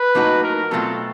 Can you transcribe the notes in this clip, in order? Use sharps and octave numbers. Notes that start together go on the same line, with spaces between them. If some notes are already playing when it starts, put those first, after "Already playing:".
Already playing: B4
A2 F#3 A#3 D#4 F#4
A#4
B2 F#3 A3 C4 F4 A4